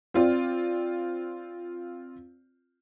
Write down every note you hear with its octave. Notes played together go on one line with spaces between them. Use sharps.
C4 F4 D5